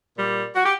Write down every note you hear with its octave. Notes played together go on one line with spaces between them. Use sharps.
A#2 G3
F#4
G4